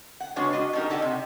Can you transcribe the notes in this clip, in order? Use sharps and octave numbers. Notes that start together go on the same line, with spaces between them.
F#5
C#3 G#3 B3 D4 F#4 C#5
D4 F#4 D#5
B2 D4 D#4 G4 A#4
G4 A4 D5 D#5 F#5 G#5
C3